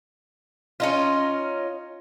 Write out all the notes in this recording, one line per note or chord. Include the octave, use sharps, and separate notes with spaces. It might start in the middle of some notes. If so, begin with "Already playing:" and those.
C#4 D#4 F4